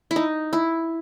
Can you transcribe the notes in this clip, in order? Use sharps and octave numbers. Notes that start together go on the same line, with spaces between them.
E4
D#4
E4